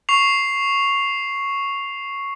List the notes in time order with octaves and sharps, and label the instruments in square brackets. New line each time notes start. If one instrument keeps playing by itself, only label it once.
[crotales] C#6 C7 F7